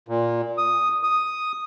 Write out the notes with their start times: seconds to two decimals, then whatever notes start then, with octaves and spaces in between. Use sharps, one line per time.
0.08 A#2
0.58 D#6
1.03 D#6